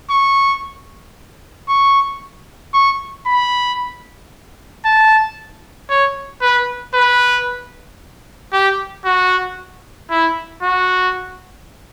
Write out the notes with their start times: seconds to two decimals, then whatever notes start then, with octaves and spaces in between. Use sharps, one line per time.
0.10 C#6
1.69 C#6
2.74 C#6
3.26 B5
4.85 A5
5.90 C#5
6.42 B4
6.94 B4
8.53 G4
9.05 F#4
10.11 E4
10.63 F#4